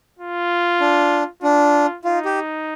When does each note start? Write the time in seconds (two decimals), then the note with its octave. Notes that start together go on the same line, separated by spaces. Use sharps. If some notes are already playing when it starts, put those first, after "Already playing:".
0.19 F4
0.80 D4
1.42 D4 F4
2.04 D#4 F4
2.25 G4